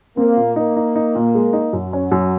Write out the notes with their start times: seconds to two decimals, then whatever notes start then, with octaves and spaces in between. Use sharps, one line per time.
0.17 A#3 C4
0.37 A#2
0.56 A#3 D#4
0.76 D#4
0.96 D#4
1.15 A#2
1.35 G#3
1.53 D#4
1.73 F#2 F#3
1.93 C#4
2.12 F#2